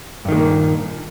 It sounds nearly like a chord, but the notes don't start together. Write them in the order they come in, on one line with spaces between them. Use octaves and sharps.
G2 D#3 G#3 A#3 A#2